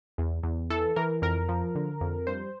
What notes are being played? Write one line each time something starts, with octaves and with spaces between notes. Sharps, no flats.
E2
E2
E3 A4
E3 A#4
F2 A#4
F3
D3
F2
G2 C5